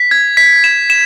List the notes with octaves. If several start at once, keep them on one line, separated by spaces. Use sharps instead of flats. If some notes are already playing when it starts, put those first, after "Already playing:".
Already playing: B6
G#6
B6
E7
E7